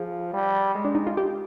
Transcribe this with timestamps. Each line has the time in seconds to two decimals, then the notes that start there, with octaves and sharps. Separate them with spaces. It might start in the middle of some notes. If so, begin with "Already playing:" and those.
Already playing: F3 G#4
0.33 G3
0.75 G#3
0.85 D4
0.95 D#4
1.07 F4
1.17 G4